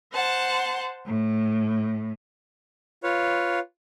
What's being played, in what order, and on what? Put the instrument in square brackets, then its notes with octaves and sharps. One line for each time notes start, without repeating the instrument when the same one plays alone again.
[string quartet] C5 F#5 A5
A2
[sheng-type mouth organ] F4 B4 C#5 F5